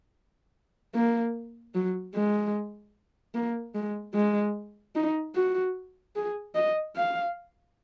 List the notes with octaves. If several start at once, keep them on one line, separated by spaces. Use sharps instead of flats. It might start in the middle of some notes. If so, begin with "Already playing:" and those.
A#3
F#3
G#3
A#3
G#3
G#3
D#4
F#4
G#4
D#5
F5